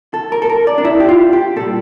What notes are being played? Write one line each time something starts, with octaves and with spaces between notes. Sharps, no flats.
A4
A#4
A4
A#4
D5
D4
E4
G4
F4
G4
A#2 G3 A4